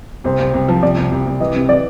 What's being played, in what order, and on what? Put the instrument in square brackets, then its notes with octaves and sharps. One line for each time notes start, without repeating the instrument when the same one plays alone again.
[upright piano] C2 [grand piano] C5
[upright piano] C2
C2
F3
[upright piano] C2 [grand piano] D5
[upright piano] C2
C2
C2
[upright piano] E3 [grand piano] D#5
[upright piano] C3
[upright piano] E3 [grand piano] D5